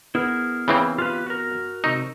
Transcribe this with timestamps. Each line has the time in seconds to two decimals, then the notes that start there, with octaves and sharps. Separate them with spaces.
0.15 B3 E4 G#4 A#4
0.68 C#3 E3 C4
0.98 F4 G4 B4
1.26 F#4 A#4
1.84 C3 D#4 C#6 E6